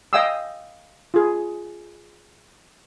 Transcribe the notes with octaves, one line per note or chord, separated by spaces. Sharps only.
D#5 F5 G5 G#5 D#6 E6
F4 G#4